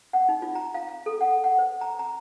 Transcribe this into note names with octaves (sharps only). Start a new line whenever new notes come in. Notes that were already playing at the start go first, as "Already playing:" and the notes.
F#5
D#4
F4
A#5
F5
F5
A4
F#5
F#5
C5
A#5
A#5